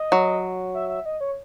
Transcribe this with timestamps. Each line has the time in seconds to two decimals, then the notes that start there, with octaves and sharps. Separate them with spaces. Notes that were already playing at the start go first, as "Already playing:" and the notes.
Already playing: D#5
0.12 F#3
0.75 E5
0.89 E5
1.06 D#5
1.21 C#5